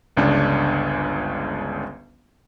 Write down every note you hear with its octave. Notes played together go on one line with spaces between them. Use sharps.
G1 C#2 C#3 C#4 D4